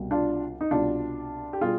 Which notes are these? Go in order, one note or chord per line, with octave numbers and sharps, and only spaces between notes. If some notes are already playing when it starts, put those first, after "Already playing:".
Already playing: C2 B2 G3
D4 F4
D#4
C2 B2 G3 D4 F4
G4
B2 G3 F4 G#4